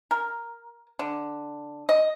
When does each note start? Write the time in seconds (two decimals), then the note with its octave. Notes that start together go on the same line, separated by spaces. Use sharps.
0.11 A#4
0.99 D3
1.89 D#5